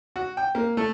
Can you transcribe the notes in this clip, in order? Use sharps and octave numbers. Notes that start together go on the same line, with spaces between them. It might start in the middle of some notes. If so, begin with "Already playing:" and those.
F#4
G5
A#3
A3